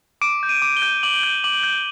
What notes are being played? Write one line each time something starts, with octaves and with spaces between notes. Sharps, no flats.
D6 D7
G6
D#7
D6
G7
G6
D6 F#7
G6
D6 F#7
G6